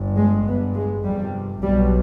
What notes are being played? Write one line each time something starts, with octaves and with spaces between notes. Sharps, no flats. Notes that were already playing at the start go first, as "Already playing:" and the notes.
Already playing: G1 G2
G#3
G1 G2 B3
G#3
G1 F2 C3 G3
B1 B2 G3